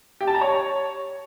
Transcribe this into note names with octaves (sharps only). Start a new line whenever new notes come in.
G4
A5
A#5
C#5